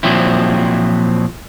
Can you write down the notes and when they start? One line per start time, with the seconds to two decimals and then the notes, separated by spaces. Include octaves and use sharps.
0.03 A#2 F3 F#3 C4 E4